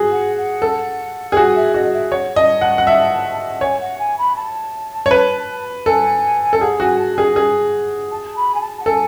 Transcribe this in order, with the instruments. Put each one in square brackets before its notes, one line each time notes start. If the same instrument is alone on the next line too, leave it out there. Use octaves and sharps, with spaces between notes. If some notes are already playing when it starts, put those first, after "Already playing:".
Already playing: [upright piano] F#4 G#4
[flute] F#5
F#5
[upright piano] A4
G#4
[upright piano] F#4 [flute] G#5
[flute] E5
[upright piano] F#4 [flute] D#5
[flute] E5
[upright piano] C#5 [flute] F#5
[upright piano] D#5 [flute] A5
[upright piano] F#5 [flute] A5
[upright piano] F#5
E5
[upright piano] C#5 [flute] G#5
[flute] F#5
G#5
B5
A5
[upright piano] C#5
B4
[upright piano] A4 [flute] G#5
[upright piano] A4
[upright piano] G#4 [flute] F#5
[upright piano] F#4 [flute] G#5
[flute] A5
[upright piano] G#4 [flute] G#5
[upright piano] G#4
[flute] A5
B5
G#5
A5
F#5
[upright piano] A4 [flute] G#5